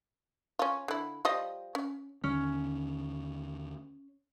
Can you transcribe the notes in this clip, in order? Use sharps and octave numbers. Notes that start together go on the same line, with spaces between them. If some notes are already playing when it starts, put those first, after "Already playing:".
C#4 F4
D3 E4
F3 G3 D#5
C#4
D#2 D3 D#3 C#4